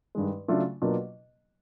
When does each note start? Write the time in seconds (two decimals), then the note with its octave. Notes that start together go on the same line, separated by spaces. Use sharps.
0.15 G2 D#3 G#3
0.48 C#3 F#3 A3 D4 F4
0.82 B2 F#3 A#3 D4 F4